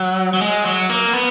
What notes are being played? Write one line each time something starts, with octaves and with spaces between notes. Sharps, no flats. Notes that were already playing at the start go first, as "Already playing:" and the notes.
Already playing: F#3
F#3
G#3
F#3
A#3
B3